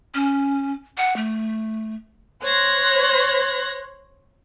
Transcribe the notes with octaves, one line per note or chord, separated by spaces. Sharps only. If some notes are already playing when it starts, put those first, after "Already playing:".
C#4
F#5
A3
C5 C#5 F#6 A#6